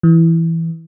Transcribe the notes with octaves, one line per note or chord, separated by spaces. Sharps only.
E3